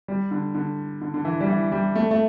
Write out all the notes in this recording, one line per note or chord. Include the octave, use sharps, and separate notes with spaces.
G3
D3
D3
D3
D3
E3
G3
E3
G3
A3
A3